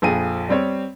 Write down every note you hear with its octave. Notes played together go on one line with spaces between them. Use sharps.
A#1 F2 G#4 D#7
G3 C4 C#5